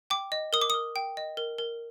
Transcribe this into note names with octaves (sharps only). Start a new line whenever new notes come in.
G5 D6
D#5
A#4 D#6
D6
A#4 D#6
G5
D#5
A#4
A#4